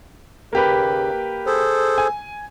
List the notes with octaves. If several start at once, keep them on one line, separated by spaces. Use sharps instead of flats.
D#2 C#3 A#3 G4 B4
G#4 A4 C5
G#5